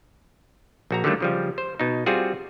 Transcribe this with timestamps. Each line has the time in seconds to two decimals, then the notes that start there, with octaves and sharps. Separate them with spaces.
0.91 A#1 F#4 A#5
1.04 D3 D#3 F#3 G3 A3 A#3
1.20 C#3 F3 G3
1.58 C5
1.80 B2 D#4
2.06 G3 C4 F4 F#4 G#4